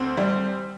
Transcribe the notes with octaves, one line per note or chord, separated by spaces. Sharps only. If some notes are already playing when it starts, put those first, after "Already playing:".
Already playing: D2 C4
G3